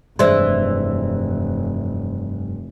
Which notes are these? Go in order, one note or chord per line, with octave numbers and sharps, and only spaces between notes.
F1 G2 E3 G3 G#3 C5 D5 C6